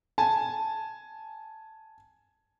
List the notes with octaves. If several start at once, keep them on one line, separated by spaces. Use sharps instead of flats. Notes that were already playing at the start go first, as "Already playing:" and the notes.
G#5 A5